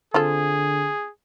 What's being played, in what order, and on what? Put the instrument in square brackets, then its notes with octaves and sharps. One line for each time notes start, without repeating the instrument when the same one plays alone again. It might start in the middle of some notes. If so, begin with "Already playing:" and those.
[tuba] D3 [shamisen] C4 F4 A4 [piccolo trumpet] G#4